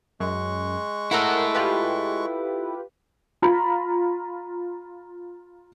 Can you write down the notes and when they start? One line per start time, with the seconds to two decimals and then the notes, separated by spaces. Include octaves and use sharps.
0.20 F#2 G#3 C#6 F#6
1.11 E4 A4 A#4 F#5
1.54 F4 G4 B4
3.42 F4 A#5 B5